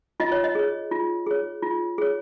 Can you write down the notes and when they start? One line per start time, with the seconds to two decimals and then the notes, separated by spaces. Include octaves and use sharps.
0.20 F4 D#5
0.32 C#5
0.44 D#5
0.55 G#4 C#5
0.91 F4
1.27 G#4 C#5
1.62 F4
1.98 G#4 C#5